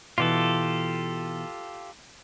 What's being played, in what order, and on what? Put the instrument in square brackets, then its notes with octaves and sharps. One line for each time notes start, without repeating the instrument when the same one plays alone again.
[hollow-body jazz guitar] B2 E3 [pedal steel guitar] F4 G4 A4